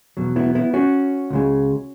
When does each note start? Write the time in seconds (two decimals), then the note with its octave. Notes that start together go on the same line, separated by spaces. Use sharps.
0.17 E2 B2 F#3
0.36 B3 E4
0.55 B3 E4
0.74 C#4 F#4
1.30 C#2 C#3 G#3